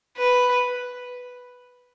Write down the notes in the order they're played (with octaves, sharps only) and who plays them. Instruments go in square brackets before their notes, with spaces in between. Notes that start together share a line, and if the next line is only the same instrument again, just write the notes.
[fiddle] B4